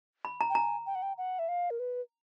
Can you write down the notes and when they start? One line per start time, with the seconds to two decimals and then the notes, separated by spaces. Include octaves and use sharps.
0.25 B5
0.41 A#5
0.50 G5
0.55 G#5 A#5
0.86 G5
0.95 F#5
1.02 G5
1.18 F#5
1.39 E5
1.48 F5
1.70 A#4
1.79 B4